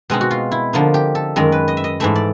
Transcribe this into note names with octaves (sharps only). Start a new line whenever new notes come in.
B2 G#3 C4 D#4
F#4
F4
E4
D3 F3 A#3 D#4
G4
A4
F#2 D#3 G#3 A#4
B4
D#5
E5
D#5
G#2 E3 A3 E5
D5